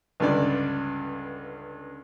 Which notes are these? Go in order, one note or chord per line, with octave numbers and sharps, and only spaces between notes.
C#2 G2 D3 D5